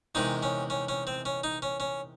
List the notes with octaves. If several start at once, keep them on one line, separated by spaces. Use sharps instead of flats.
E2 C3 D#3 G#3 D#4
C#4
C#4
C#4
C4
C#4
D#4
C#4
C#4